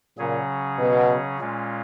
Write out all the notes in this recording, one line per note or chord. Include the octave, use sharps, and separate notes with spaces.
A#2 C#3 F#3 C#4 G#4
B2
A#2 G#3 C#4 F4